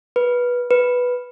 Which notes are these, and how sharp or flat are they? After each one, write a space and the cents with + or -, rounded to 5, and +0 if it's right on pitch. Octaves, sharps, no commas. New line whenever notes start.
B4 -15
B4 -5